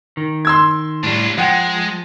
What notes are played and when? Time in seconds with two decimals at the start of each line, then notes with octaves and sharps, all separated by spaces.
0.17 D#3
0.45 C6 E6 G#6
1.03 A2 G3 D4 F4
1.38 F3 G#3 F#5 G5